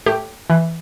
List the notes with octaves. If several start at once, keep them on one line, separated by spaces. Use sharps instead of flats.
A2 G4
E3